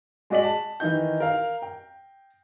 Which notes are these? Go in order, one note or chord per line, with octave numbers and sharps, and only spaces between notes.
G#3 F#4 D5 D#5 B6 F#7
A5
D#3 E3 D#4 D#5 G6
A#4 F5
G5